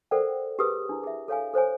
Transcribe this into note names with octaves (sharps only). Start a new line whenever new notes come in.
A4 A#4 C5 D5 F#5 G5
G4 G#4 A#4 B4 D#6
D4 E4
G#4 E5
A4 C#5 F5 G#5
A4 C5 C#5 G#5